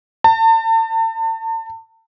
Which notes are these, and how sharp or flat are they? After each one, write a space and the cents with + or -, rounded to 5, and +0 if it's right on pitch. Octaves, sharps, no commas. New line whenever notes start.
A5 +40